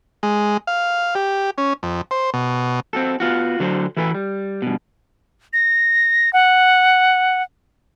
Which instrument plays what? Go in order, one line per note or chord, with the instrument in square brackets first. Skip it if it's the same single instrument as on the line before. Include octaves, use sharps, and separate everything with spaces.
[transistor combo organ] G#3
F5
G4
C#4
F2
C5
B2
[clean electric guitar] C4 F#4 A4
B3 F4 F#4
D3 F#3 F#4 C5
E3 E4 F#4 A4 B4
G3
G2 B2
[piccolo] A#6
F#5